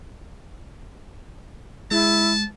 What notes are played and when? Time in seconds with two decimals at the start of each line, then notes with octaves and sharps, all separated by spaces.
1.91 G#3 E4 A5